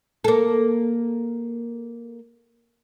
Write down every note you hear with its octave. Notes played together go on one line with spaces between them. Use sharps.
A#3 A4